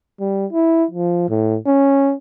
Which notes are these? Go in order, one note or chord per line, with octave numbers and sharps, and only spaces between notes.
G3
E4
F3
A2
C#4